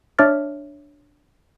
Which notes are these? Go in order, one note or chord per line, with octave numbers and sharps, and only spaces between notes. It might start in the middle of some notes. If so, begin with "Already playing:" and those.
D4 C#5 E5 D6 F6 A6